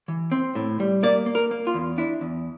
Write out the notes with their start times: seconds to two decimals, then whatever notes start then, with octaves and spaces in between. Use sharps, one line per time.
0.08 E3
0.32 C4
0.55 A2
0.80 G3
1.03 A#3 D5
1.26 A#3
1.35 A#4
1.51 A#3
1.67 F4
1.74 E2
1.98 D4 E4
2.21 E2